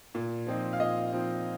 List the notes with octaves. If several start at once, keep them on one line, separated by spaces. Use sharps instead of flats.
A#2
F3 C4 D#4
F5
A#2 D#5
F3 C4 D#4